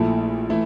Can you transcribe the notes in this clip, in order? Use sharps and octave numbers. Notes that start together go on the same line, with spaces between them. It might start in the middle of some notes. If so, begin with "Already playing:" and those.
Already playing: A#1 A#2 A3 E4 A4
E3 A3 E4